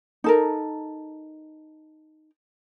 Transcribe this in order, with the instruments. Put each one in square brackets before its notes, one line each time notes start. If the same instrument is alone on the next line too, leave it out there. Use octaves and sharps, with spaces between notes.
[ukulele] D#4 A4 A#4